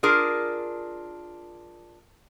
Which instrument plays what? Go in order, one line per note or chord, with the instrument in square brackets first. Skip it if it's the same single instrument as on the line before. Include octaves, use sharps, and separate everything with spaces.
[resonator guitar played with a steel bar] D4 F4 G#4 A#4